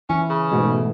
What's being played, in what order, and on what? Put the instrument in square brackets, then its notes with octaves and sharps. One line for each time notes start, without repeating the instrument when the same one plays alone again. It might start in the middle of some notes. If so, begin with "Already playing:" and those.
[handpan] E3 E4 [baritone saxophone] C#4
[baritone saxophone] C#3
[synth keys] G#2 B2 [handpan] A3